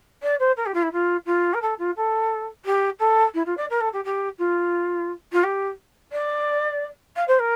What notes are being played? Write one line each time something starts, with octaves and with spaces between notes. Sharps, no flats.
D5
C5
A#4
G4
F4
E4
F4
F4
A#4
A4
F4
A4
G4
A4
E4
F4
D5
A#4
A4
G4
G4
F4
F4
G4
D5
F5
C5
A#4